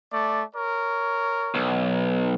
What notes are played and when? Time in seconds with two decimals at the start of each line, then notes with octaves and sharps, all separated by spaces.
0.11 A3 D5
0.55 A#4 C#5
1.55 B1